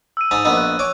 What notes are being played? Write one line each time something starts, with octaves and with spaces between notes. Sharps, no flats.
E6 D#7
G#2 D#4 A5 F7
A#1 B3 D#4 E6
F#6
C#5 G#5 D6